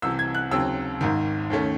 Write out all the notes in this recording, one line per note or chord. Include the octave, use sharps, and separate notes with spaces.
C2 C3 E3 E6
G#6
F#6
D#2 C#3 F#3 C4 E6
G#1 G#2 D#3
D#2 D#3 A3 C#4